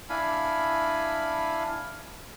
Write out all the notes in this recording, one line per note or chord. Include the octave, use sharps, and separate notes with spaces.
D4 E4 F5 G#5 B5